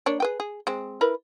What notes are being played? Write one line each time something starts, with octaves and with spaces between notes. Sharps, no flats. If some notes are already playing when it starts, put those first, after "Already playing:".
A#3 D4 C#5
G#4 B4 G5
G#4
G#3 C4
E4 A#4 B4